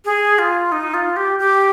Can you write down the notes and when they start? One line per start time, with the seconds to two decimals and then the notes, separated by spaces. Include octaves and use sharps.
0.05 G#4
0.39 F4
0.72 D#4
0.94 F4
1.16 G4
1.39 G4